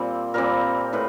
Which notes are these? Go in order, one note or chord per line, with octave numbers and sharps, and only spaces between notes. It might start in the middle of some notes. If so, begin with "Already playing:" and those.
Already playing: A#2 G3 C4
A#2 G3 C4 A#4
A2 B4